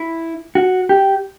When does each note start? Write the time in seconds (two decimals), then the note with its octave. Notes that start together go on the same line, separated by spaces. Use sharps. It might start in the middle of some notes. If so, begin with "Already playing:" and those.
Already playing: E4
0.55 F#4
0.89 G4